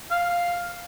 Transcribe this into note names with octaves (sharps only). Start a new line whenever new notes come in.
F5